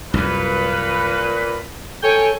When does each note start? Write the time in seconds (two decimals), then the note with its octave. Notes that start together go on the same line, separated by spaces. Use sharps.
0.14 C2 F#2 A#2 B4
2.03 A4 C#5 G5 G#5